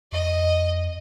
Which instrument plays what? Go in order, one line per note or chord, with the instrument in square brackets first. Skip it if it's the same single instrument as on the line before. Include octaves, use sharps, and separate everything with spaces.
[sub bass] F2 [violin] D#5